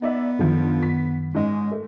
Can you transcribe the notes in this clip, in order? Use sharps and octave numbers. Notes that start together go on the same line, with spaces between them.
B3 D#4 D5 E5
F#2 D3 D#3 F3 F4
B6
G#2 G#3 C#4 D#5
A3